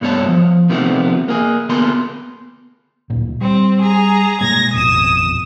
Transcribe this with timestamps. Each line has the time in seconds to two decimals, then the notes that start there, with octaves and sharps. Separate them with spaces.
0.01 C2 G2 A3 B3 C#5 A5
0.29 F3
0.70 C3 D#3 F3 A3 B3
1.28 A#3 G#4
1.69 D2 A#3 B3 G#4 A4 C6
3.10 D1 A#2
3.41 G3 C4
3.82 G#4 A#5
4.41 B2 G#3 A#3 G#6 A#6
4.74 A1 F2 B2 D#6 E7